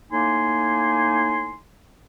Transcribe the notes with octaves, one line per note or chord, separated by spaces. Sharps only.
A2 A#3 D#4 G#5 C6